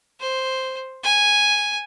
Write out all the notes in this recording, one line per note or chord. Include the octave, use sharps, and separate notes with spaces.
C5
G#5